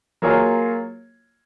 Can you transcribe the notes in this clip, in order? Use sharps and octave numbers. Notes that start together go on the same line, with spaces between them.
F#3 A#3 F4 G#4 C#5